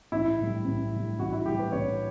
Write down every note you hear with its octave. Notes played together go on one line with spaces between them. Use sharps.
A1 E4
A2
G3
A1
A2 G3
A1 F#4
E4
A2 G3 G4
B4
A1 C#5